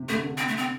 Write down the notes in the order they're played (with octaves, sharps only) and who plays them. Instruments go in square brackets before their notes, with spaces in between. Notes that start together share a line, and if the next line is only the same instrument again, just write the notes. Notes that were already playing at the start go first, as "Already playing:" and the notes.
Already playing: [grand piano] C3
[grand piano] D3 [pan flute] A3
[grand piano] D3
[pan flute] C4
A3
C4